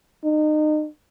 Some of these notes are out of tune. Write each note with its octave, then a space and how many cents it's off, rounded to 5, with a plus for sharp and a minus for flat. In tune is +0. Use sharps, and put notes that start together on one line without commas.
D#4 -30